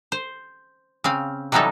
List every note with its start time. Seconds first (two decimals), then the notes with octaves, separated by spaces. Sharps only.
0.12 C5
1.04 C#3 C4 F5
1.52 C3 E3 F#3 G3 D#4 A4